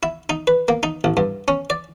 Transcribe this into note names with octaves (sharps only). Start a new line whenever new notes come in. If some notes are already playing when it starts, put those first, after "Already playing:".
E4
D#4
B4
A#3
D#4
A1
G2
C#4
D5